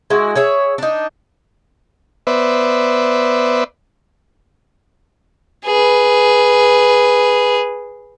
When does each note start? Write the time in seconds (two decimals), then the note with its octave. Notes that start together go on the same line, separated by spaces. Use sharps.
0.10 G#3 E4 F#4
0.35 G#4 C#5 E5
0.78 D4 D#4
2.27 B3 B4 C5 D5 E5
5.66 G#4 B4